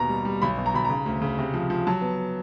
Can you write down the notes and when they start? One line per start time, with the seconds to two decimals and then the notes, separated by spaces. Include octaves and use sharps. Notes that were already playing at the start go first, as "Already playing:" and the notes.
Already playing: D#2 B2 A#5
0.09 G3
0.25 G3
0.42 B1 B5
0.58 B2
0.66 A#5
0.74 B1 B5
0.85 C#3 A#5
1.06 D2
1.22 C#3
1.39 C3
1.54 F3
1.70 F3
1.87 F#3 A5
2.02 B3